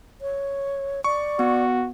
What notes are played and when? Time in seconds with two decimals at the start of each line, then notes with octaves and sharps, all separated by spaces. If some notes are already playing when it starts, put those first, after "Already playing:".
0.21 C#5
1.04 D5 C#6
1.39 B3 F#4